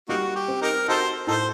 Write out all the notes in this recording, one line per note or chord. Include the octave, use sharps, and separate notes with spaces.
G3 A#3 D#4 F#4
G4
C4
D#4 G4 A#4
D#4 F#4 A4 C5
A2 D#4 A4 C5